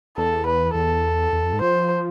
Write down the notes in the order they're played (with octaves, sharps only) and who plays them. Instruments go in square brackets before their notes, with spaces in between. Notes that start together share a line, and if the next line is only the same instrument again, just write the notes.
[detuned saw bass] E2 [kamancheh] A4
[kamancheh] B4
[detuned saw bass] E2 [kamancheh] A4
[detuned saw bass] E2
F2
G#2
[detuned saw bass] F3 [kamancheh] C5